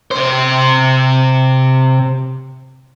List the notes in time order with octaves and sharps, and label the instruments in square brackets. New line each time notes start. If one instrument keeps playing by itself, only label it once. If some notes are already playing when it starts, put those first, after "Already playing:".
[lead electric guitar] C3 C5